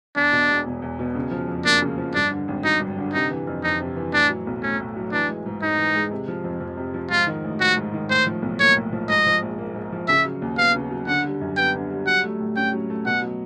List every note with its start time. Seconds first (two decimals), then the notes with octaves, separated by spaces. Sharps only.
0.16 E2 D4
0.32 B2
0.50 E1
0.66 E1
0.82 E2
0.99 B2
1.15 C#3
1.31 F3
1.48 F2
1.65 A#3 D4
1.81 C#3
1.98 F3
2.14 G2 D4
2.31 D3
2.48 G#1
2.64 F#3 D#4
2.80 G2
2.98 D3
3.14 C3 D#4
3.30 E3
3.47 F2
3.63 F2 D#4
3.80 C3
3.96 E3
4.13 A2 D4
4.30 F#3
4.47 B1
4.63 A3 C#4
4.80 A2
4.96 F#3
5.12 E3 D4
5.28 G#3
5.46 G#2
5.62 G#2 D#4
5.78 E3
5.95 G#3
6.11 C3
6.28 F3
6.44 F2
6.61 F2
6.77 C3
6.94 F3
7.11 G#2 F4
7.27 D#3
7.44 A1
7.60 A1 F#4
7.76 G#2
7.94 D#3
8.10 A2 C5
8.26 F3
8.42 B1
8.60 A#3 C#5
8.76 A2
8.92 F3
9.09 G#2 D#5
9.26 F3
9.42 A#1
9.58 A#3
9.75 G#2
9.92 F3
10.08 C#3 E5
10.25 F#3
10.42 D#2
10.57 B3 F5
10.75 C#3
10.91 F#3
11.07 D3 F#5
11.24 G3
11.41 F#2
11.57 B3 G5
11.74 D3
11.90 G3
12.06 F#3 F#5
12.24 A3
12.39 A2
12.56 C#4 G5
12.73 F#3
12.90 A3
13.05 B2 F#5
13.22 F#3